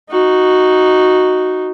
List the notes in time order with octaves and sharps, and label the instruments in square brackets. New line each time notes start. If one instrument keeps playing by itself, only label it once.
[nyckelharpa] D#4 F#4